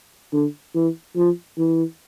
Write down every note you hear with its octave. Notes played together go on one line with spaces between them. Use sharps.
D3
E3
F3
E3